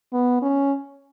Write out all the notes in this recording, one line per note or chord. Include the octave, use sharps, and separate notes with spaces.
B3
C#4